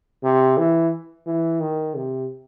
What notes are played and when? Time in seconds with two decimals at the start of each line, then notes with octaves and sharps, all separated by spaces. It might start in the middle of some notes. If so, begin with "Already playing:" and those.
0.24 C3
0.58 E3
1.27 E3
1.61 D#3
1.95 C3